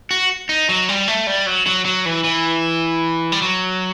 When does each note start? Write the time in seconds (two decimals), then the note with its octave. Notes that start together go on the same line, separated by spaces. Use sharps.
0.11 F#4
0.49 D#4
0.69 F#3
0.89 G3
1.08 A3
1.27 G3
1.46 F#3
1.66 F#3
1.85 F#3
2.06 E3
2.24 E3
3.32 G3
3.42 F#3